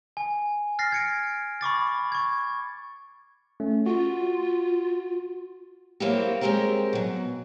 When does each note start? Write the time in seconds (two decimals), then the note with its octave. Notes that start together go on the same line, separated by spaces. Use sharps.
0.17 G#5
0.79 F6 A6 A#6 C7
0.92 G#6 C#7 D7
1.61 B5 C#6 D6 A6
2.12 C#6 G#6
3.60 A3 C#4
3.86 F4 F#4
6.00 F#3 A#3 C4 E4 F#4 G4
6.41 F#3 G#3 B3 C4 G4 A#4
6.93 B2 F#3